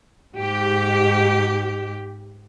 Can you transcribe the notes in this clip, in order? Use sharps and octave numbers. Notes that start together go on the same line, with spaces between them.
G#2 G4